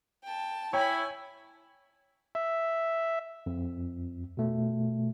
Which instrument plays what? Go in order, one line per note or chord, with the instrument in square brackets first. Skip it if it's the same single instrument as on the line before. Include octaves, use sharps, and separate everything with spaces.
[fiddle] G5 A5
[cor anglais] E4 [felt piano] C#5 G5 [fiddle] G#5 B5
[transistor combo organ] E5
[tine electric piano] F2
B2 A3